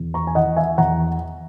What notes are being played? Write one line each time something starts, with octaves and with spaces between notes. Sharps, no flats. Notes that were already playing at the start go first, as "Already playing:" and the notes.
Already playing: E2
A#5 C#6
G#5
E3 D#5 F#5
E5 G#5
E2 F#5 A#5